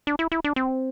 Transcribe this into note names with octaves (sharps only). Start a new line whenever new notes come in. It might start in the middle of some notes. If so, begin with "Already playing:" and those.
D4
E4
E4
D4
C4